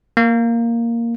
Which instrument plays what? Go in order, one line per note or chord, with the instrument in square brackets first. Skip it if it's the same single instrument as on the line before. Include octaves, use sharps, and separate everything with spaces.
[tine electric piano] A#3